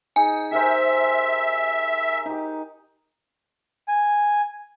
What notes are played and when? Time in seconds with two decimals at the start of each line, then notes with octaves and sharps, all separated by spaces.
0.16 D#4 G#4 G#5
0.51 G4 A#4 C5 E5
2.25 D#4 G4
3.88 G#5